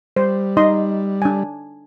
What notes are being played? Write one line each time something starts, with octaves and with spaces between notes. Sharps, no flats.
G3 C5
D#4 D#5 C6
D4 G#5